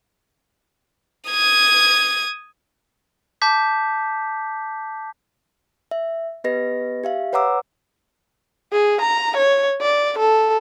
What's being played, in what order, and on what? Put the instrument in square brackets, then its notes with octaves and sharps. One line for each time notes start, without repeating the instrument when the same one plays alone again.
[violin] D#6 G#6
[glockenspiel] A5 D6 G6 B6
[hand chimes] E5
B3 G4 B4 D#5 A#6
G4 E5 F5
B4 C#5 F#5 A#5 D6 E6
[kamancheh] G#4
A#5
C#5
D5
A4